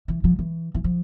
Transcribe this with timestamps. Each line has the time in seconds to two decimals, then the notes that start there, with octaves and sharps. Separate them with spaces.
0.08 E3
0.24 F3
0.39 E3
0.74 E3
0.84 F3